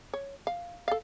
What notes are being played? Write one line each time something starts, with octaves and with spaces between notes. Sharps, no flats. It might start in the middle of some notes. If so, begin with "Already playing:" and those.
C#5
F5
A4 F5